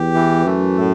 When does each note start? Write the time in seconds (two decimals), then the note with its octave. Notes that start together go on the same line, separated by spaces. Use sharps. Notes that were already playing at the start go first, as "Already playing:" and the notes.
Already playing: E2 G4
0.14 E3
0.46 F#2 A3
0.78 A2